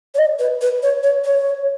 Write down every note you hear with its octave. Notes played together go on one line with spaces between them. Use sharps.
C#5
D#5
B4
B4
C#5
C#5
C#5